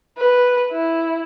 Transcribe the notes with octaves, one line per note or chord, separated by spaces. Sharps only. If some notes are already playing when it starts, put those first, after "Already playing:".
B4
E4